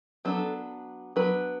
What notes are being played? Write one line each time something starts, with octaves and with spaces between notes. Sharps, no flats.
F#3 B3 D4 A4
F#3 B3 D4 B4